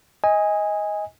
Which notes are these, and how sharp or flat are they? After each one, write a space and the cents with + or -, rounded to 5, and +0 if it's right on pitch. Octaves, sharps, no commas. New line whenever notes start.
D#5 +20 G#5 -15